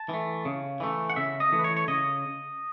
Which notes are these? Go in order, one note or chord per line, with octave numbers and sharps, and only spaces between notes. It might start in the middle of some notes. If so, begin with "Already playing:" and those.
Already playing: A5
E3 A3
C#3
E3 A3
F#5
C#3 E5
D#5
E3 A3
B4
C#5
C#5
C#3 D#5